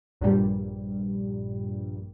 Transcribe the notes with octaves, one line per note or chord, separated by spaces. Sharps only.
A#1 G2 A#2 G3